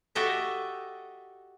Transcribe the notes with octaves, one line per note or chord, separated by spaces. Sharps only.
F#4 G4 A4 D#5 E5